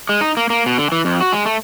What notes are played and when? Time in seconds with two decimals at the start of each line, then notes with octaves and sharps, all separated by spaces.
0.09 G#3
0.21 D#4
0.37 A#3
0.50 A#3
0.66 B2
0.78 D3
0.92 E3
1.05 F2
1.21 F#4
1.33 G#3
1.46 A3